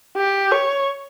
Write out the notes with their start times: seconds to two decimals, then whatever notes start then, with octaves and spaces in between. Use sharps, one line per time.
0.17 G4
0.51 C#5